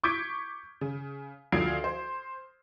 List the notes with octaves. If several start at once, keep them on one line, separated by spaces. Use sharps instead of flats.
C#6 D6 G6 G#6 B6 D7
C#3
D2 F3 F5 G#6 C7 D7
C5